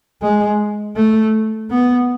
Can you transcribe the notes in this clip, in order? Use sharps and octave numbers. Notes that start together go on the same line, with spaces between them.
G#3
A3
B3